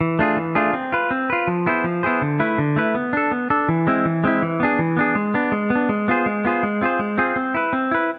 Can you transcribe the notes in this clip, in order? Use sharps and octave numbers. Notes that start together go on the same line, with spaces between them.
E3
A3 D4 F4 G#4
E3
A3 D4 F4 G#4
C4
F4 B4
C4
F4 B4
F3
B3 E4 G#4 C5
F3
B3 E4 G#4 C5
D3
A3 E4 B4
D3
A3 E4 B4
B3
D4 A4
B3
D4 A4
E3
G#3 C4 E4
E3
G#3 C4 E4
E3
B3 D4 G#4
E3
B3 D4 G#4
G#3
B3 D4
G#3
B3
D4
G#3
B3 F4 G#4 C5
G#3
B3 F4 G#4 C5
G#3
C4 F4 G#4 C5
G#3
C4 F4 G#4 C5
C4
E4 B4
C4
E4 B4